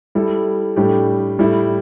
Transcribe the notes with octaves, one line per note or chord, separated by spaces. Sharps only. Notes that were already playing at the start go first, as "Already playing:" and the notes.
G3 E4 A4
A2 G3 D4 G4
A2 G3 E4